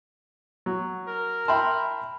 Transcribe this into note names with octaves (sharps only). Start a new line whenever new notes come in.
F#3
A#4
E5 G5 A5 B5 C6